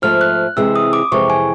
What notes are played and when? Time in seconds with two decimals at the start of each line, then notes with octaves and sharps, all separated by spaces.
0.02 G#2 F3 A3 F6
0.21 F#6
0.57 C3 E3 G#3 C4 E6
0.76 D#6
0.93 D6
1.12 F2 C3 E3 G#3 C#6
1.30 G#5